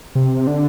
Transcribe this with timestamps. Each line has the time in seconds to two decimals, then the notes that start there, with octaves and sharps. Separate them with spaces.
0.15 C3
0.47 D3